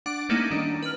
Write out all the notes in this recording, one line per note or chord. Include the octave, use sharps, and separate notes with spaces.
D4 F#5 D6
G3 A3 A#3 C#4 D#4 E4
D#3 D4
B4 F6